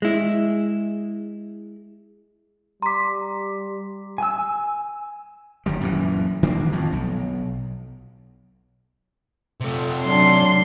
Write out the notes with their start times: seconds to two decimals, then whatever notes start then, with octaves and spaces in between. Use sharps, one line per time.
0.02 G#3 E4
2.82 G3 A#5 C6 D6 B6
4.18 G#5 E6
5.66 F#1 D#3 G3
5.81 F#2 A#2 D#3 E3
6.43 D#3 G3 A#3 D4
6.72 F2 A2
6.93 B1
9.60 C3 A3
10.04 F#3 D4 C6